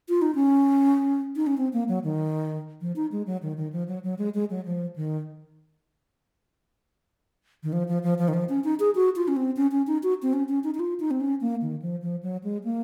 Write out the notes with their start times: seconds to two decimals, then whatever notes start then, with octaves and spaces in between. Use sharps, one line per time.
0.09 F4
0.22 D#4
0.35 C#4
1.36 D#4
1.47 C#4
1.57 C4
1.73 A#3
1.88 F#3
2.04 D#3
2.81 F3
2.96 D#4
3.12 G#3
3.27 F#3
3.42 D#3
3.57 D#3
3.73 F3
3.88 F#3
4.04 F#3
4.18 G#3
4.34 G#3
4.50 F#3
4.65 F3
4.96 D#3
7.63 D#3
7.73 F3
7.88 F3
8.03 F3
8.18 F3
8.28 D#3
8.34 F3
8.49 C#4
8.64 D#4
8.80 G#4
8.95 F#4
9.16 F4
9.28 C#4
9.36 C4
9.57 C#4
9.72 C#4
9.87 D#4
10.03 F#4
10.22 C4
10.33 C#4
10.49 C#4
10.64 D#4
10.75 D#4
10.80 F4
11.00 D#4
11.11 C4
11.20 C#4
11.41 A#3
11.62 D#3
11.82 F3
12.02 F3
12.23 F#3
12.44 G#3
12.64 A#3